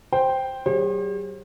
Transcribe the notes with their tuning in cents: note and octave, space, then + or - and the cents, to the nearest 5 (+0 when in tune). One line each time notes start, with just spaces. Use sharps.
C5 +0 G5 +0
F#3 +45 G#4 -45 C5 +40